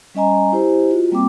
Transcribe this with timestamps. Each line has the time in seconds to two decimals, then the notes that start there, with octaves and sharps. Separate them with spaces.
0.15 G3 C#4 D#5 G#5 A#5
0.52 E4 G4 C5
0.91 F4 F#4
1.11 G3 A#3 C4 G5 D6